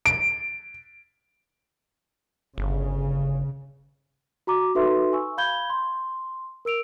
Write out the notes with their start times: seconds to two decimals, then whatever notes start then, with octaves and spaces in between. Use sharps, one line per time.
0.06 D7
2.58 G1 C#3
4.47 F#4 A#5 D6
4.75 D#4 F#4 A4 B4 E5 C6
5.13 G#5 C#6 E6
5.38 F5 B5 G6 G#6 G7
5.70 C6
6.65 A#4 E6 D7 F7